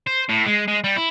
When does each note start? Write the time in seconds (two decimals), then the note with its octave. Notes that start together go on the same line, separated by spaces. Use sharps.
0.07 C5
0.29 A2
0.46 G#3
0.68 G#3
0.84 G3
0.96 E4